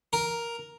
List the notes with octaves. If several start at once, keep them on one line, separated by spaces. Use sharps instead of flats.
A#4